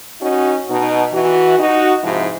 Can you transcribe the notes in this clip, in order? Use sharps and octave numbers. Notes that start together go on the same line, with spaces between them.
C#4 D#4 F#4
B2 D#4
E3 F#4
D#4 F#4
G#2 C3 F3 E4